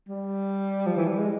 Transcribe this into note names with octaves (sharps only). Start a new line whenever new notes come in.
G3
F3
E3
G3
G#3